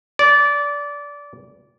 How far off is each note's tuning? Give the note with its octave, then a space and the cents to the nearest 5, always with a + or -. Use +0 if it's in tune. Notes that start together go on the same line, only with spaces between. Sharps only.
D5 -20